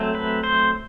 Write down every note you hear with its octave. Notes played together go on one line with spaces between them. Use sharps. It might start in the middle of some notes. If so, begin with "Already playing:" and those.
Already playing: F#3 A3 C4
B4
C5